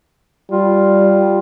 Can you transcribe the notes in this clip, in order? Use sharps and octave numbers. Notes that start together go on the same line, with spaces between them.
G3 F4